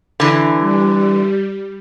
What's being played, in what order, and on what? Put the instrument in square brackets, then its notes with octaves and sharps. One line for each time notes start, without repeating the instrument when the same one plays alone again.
[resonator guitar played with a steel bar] D3 E3
[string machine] G3